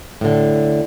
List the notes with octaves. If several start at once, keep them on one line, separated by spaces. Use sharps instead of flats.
A2 D3